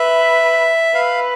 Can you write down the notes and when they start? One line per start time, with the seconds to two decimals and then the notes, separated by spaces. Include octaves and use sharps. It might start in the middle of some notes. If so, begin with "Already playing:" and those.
Already playing: B4 E5
0.94 B4 F5